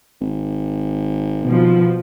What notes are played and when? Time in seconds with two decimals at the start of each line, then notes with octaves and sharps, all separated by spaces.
0.21 G#1
1.45 B2 F3